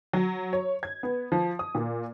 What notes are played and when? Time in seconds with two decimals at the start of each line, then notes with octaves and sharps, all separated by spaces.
0.13 F#3
0.53 C#5
0.83 G#6
1.03 B3
1.32 F3
1.59 D#6
1.75 A#2